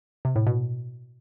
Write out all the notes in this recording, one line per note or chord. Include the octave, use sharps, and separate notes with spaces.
C3
A2
B2